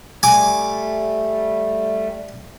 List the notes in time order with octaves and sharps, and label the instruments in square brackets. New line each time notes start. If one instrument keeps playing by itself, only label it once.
[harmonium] G3 A3 [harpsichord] G#5 D6